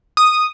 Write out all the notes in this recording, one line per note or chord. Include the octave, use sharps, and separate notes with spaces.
D#6